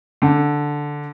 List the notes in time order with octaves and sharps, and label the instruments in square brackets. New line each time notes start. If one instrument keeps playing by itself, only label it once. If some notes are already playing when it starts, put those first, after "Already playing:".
[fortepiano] D3